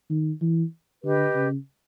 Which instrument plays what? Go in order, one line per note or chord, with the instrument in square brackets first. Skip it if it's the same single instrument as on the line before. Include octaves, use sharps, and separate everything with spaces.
[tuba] D#3
E3
[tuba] D3 [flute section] G4 B4 D#5
[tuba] C#3